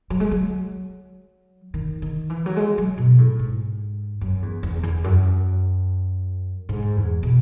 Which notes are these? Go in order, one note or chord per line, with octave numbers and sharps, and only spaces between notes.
F#3
G#3
F#3
D#3
D#3
E3
F#3
G#3
F#3
B2
A2
G#2
F#2
E2
E2
E2
F#2
G#2
E2
B2